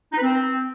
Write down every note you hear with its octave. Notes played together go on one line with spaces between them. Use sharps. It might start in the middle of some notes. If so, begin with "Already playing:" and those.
D#4
B4
C4